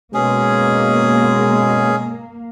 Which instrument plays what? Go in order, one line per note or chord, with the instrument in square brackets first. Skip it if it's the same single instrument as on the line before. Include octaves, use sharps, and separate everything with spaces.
[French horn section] B2 G#3 [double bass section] A#3 [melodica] C#4 G#4